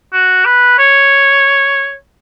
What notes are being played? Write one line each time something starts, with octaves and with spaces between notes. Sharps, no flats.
F#4
B4
C#5